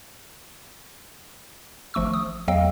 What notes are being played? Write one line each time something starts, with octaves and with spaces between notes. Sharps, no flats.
G#1 F3 A3 C#6 E6
D#6
E2 F#3 D#5 F5 G5 E6